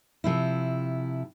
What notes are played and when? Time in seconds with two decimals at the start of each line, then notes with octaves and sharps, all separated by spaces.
0.24 C3 F3 E4